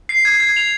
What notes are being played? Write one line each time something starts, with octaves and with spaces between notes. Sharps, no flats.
C7
G#6
G#6
F7